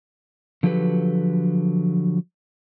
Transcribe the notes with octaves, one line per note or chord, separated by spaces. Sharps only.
D3 F3 F#3 G4 A4 B4